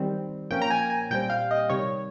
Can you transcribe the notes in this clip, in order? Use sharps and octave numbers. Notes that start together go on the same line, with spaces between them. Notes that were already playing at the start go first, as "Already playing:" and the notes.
Already playing: D#3 G3 C4
A#2 F3 A#3 C#4 G5
A#5
G#5
G#5
A#2 G3 C4 G5
F5
D#5
C3 D#3 G3 C#5